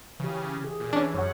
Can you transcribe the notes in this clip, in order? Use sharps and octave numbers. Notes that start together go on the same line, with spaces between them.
C#3 E3 G4
G#4
A#2
E3 C#4 D4
F#2 C#5 F#5